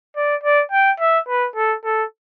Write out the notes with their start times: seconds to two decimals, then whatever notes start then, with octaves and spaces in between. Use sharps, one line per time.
0.16 D5
0.43 D5
0.71 G5
1.00 E5
1.28 B4
1.56 A4
1.84 A4